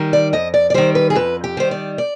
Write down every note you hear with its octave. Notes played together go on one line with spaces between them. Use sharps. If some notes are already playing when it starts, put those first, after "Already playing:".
Already playing: D#3 G3
D5
F2 D#5
D5
D5
D#3 G3 C5
B4
G#4
F2 B4
G4
D#3 G3 C5
D5
D5